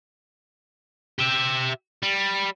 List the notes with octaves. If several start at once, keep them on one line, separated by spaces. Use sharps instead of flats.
G4 E5
G3